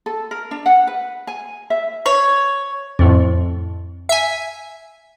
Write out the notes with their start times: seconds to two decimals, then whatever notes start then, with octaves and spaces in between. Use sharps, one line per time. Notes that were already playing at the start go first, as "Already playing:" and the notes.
0.06 A4
0.31 A#4
0.51 D4
0.66 F#5
0.87 B4
1.27 G#5
1.70 E5
2.06 C#5
2.99 F2 A2
4.09 E5 G#5